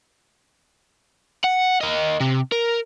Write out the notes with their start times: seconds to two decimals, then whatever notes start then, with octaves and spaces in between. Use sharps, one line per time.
1.44 F#5
1.81 A#3 D#5
2.20 C3
2.52 A#4